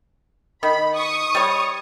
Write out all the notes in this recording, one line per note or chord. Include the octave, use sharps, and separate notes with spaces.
D#3 B5
C#6 D#6
G3 C#5